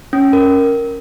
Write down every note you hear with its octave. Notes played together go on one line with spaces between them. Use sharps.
C#4
A#4